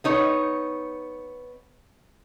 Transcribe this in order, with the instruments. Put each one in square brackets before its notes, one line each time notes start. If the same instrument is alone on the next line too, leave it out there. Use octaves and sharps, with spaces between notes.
[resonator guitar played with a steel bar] B3 D#4 C#5